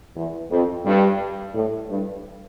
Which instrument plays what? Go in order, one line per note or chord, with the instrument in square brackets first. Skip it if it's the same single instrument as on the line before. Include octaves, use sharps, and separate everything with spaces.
[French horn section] E2
F2
G2
A2
G2